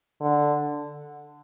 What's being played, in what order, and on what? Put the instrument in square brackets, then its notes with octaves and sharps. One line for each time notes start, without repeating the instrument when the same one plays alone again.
[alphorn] D3